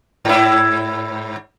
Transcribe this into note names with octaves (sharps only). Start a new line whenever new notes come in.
G#2 E4